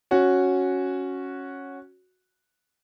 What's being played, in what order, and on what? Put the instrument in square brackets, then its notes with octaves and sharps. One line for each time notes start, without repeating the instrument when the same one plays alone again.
[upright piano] C#4 F#4